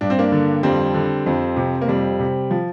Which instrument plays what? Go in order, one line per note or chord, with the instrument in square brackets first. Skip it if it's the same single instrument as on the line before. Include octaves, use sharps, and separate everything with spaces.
[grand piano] G2 D4
C4
A#3 D4
D3
F2 G3 C4
D3
F2
C3
A#3
F2 G3
C3
F3